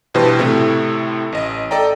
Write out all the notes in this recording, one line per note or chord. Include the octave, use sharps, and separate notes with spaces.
G2 B2 E3 G4 C5 A5
A2 C3 A3 C4 E4
A1 D#5
A4 D5 D#5 G5 A#5